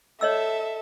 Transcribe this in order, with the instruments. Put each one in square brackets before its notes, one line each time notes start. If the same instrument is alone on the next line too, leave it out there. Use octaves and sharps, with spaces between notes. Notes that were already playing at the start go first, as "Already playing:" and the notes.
[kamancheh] A4 E5 [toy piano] C#5 D#5 E6